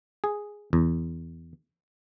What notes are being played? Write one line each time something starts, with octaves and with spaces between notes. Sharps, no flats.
G#4
E2